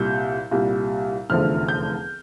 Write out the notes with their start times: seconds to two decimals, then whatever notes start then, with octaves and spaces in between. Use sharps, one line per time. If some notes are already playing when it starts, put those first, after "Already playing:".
Already playing: C2 A#2 G3 G6
0.51 C2 A#2 G3
1.29 F1 E2 D3 F3 A3 F6
1.68 G6